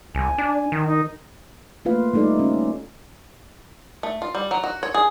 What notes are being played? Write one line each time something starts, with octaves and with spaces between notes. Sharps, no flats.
C2 G#5
D4
D#3
D#4
A3 A#3 F4 B4 F5
G3 A3 D#4 A4 D5
C#4
A3
F4
G3
F#3
F#4
C#5
G#4